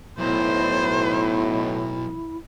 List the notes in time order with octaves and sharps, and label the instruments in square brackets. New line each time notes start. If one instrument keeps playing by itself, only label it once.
[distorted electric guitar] B1 [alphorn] A2 [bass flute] E4 [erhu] C5